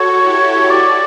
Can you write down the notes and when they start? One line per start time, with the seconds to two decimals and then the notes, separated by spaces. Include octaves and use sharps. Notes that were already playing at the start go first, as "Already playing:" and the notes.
Already playing: F#4 A4 C#5
0.20 E4 G4
0.70 F#4 D5